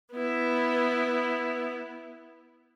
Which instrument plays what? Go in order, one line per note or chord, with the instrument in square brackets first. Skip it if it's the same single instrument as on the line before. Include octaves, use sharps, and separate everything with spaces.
[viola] B3 E4